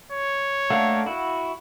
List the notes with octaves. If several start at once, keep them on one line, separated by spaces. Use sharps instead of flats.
C#5
A3 A#3 D4 F5 F#5
E4 F#4